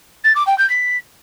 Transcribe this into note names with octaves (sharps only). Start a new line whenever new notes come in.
A6
D6
G5
G6
B6